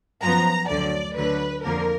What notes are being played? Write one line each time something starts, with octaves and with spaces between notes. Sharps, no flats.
F#2 F3 B3 A#5
D2 D3 F#3 D5
D2 D3 F#3 B4
F2 D3 F3 A#3 A#4